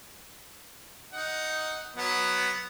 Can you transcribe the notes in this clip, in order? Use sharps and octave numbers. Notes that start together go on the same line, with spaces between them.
D#4 F#5
F#3 B3 F#5